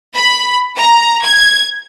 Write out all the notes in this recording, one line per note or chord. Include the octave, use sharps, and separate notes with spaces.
B5
A#5
G#6